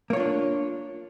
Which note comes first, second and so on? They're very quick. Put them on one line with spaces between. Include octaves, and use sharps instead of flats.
A#3 C#5 F4 D4